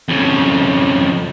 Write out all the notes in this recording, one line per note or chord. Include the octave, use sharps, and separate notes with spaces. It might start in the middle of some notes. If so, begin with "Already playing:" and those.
F2 C#3